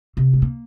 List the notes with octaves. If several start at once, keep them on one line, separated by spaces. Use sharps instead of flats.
C3
G#3
A#3